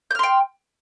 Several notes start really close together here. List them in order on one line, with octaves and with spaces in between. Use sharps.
G6 F6 C6 G5